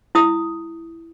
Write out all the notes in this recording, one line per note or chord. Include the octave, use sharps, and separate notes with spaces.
E4 D#6